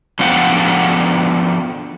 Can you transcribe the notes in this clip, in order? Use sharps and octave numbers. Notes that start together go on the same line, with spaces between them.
D3 F3 B3 C5 F#5 G5